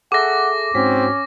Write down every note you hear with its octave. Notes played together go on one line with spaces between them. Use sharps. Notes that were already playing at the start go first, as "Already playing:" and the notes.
G#4 A4 E5 F#5 D6 A#6
G#2 C4 C#4 F#4 B6